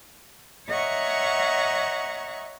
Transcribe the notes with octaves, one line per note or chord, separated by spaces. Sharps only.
C#5 D#5 E5 F#5 A#5 C#6